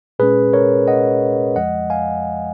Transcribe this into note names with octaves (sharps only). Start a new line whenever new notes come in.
A#2 G#3 C#4 G#4 B4
A#4 C#5
D#5 F#5
F2 F3 G#3 D#5 F#5
F5 G#5